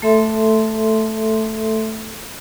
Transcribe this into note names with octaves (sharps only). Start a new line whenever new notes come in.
A3 A4 E5 C6